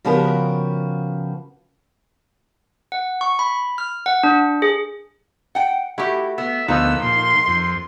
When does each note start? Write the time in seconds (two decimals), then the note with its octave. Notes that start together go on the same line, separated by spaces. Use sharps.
0.05 C#3 F3 B3 F#4 G4 A#4
2.92 F#5
3.21 C#6
3.39 B5
3.78 F6
4.06 F#5
4.23 D4
4.62 G#4
5.55 F#5 G5
5.98 A3 E4 F#4 G4
6.38 B3 E5
6.68 D2 F3 A#3 B3 D#4 D#5 E6
7.02 A#2 C6
7.47 F2